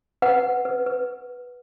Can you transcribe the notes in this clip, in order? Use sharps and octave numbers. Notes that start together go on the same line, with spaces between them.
B4 F#5
B4
B4
B4